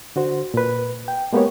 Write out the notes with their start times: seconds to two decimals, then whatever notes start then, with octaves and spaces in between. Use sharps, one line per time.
0.16 D3 F#4 C5
0.54 A#2 B4
1.08 G5
1.33 G#3 A#3 B3 G4 A#4 C#5